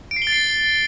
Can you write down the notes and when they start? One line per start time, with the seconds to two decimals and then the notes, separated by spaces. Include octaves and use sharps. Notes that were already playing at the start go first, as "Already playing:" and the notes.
0.11 D7
0.16 C7
0.22 G7
0.27 A6
0.32 C7